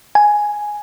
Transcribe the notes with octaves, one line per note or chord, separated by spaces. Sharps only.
G#5